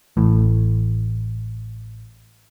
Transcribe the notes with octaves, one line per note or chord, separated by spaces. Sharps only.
A1 A2